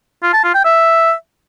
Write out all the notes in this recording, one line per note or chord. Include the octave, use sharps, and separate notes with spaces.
F4
A5
F4
G5
E5